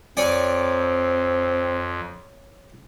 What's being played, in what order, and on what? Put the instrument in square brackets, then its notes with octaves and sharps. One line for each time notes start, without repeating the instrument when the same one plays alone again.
[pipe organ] F2 [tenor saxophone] C4 [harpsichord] C#5 D5 G#5